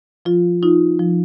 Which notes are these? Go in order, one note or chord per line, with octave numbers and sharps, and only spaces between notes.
F3 F4
D#4 F4
F3